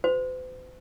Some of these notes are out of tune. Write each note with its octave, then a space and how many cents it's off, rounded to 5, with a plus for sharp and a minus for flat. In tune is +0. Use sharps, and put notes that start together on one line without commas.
F#4 +0 C5 -45